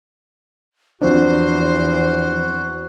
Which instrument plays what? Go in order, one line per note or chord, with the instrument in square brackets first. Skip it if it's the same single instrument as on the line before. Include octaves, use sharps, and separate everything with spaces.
[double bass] E2 [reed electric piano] F3 C4 D4 [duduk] F#4 [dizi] C5